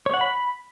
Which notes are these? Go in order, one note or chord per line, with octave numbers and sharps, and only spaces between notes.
C#5
F#5
B5